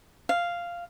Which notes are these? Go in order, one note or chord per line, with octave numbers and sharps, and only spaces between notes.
F5